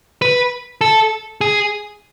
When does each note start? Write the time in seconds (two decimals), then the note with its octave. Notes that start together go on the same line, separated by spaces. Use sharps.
0.22 B4
0.81 A4
1.41 G#4